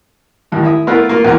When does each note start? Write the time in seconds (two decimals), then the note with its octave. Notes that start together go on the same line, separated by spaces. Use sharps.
0.52 D#2 A2
0.63 E4 E5 D#6
0.87 A3 B3 E4 F4 A#4 B4
1.09 A#3 F4
1.25 E2 A#2 E3 A#4 A#5 C6